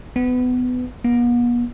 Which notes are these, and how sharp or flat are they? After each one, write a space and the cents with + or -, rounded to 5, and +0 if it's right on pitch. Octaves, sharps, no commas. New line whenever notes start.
B3 +20
B3 -45